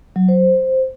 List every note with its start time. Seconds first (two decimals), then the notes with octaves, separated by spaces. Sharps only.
0.16 F#3
0.28 C5